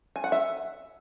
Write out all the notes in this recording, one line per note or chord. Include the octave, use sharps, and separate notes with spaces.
G#5
F#5
E5